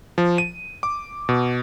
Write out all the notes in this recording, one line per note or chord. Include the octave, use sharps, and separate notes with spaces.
F3
D#7
D6
B2